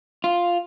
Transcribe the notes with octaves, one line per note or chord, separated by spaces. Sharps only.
F4